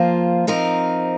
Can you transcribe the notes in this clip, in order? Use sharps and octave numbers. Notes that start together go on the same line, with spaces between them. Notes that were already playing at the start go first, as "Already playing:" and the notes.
Already playing: F3 A#3 F4 C5
F3 C4 D#4 A#4